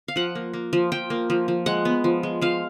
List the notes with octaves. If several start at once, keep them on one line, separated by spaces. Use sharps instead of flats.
F5
F3 F#5
A#3
A#3
F3
F3 G5
A#3
F3
F3
G#3 F#5
B3
F3
G#3
F3 F5